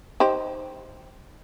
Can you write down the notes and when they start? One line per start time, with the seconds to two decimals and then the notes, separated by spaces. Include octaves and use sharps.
0.20 D#4 G4 C5